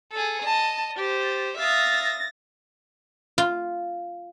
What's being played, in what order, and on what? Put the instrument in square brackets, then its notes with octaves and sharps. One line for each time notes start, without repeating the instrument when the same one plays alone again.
[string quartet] G#4 A4
[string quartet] D#5 [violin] A5
[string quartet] G4 C5 [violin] A6
[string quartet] E5 F5 D#6 [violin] A6 A#6
[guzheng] F4